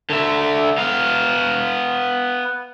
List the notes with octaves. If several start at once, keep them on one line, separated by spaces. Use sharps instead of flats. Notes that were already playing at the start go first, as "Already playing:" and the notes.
D3 E5
B3 F5